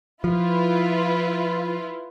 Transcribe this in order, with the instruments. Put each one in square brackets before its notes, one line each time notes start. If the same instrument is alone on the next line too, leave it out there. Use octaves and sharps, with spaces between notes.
[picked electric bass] F3 [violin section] E4 F4 B4